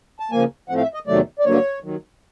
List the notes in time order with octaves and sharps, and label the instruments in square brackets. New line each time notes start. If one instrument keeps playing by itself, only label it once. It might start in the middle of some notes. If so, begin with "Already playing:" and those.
[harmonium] A5
C#3 F3 A#3 G#5
A2 F3 A3 C4 F#5
F5
E5
D#5
E2 C3 D#3 F#3 A3 D5
D5
G2 D3 F#3 A#3 C#5
D#2 D#3 F#3